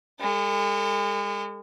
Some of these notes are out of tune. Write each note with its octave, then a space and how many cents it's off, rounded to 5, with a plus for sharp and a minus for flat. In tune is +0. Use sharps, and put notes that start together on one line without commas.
G#3 -40 A4 +40